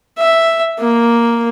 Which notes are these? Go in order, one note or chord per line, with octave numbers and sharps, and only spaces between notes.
E5
A#3